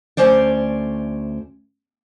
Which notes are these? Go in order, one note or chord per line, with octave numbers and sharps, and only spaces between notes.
D2 A3 C#4 C5 D5